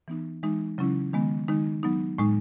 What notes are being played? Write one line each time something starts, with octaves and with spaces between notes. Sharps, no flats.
E3 B3 D#4
E3 G#3 D#4
C#3 F#3 C#4 E4
D#3 G#3 B3
D#3 G#3 D#4
F#3 B3 D#4
A2 G#3 D#4